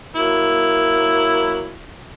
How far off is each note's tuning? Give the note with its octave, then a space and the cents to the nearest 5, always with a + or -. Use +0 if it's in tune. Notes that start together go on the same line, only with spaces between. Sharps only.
F#3 +0 A#3 +0 E4 +0